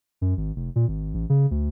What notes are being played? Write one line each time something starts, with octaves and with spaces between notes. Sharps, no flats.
F#2
G#1
F1
A#2
G#1
A1
C#3
D2